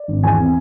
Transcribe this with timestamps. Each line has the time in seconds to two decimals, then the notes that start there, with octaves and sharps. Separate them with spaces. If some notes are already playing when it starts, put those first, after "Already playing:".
Already playing: D5
0.08 G#1
0.23 E2 G#5
0.38 C4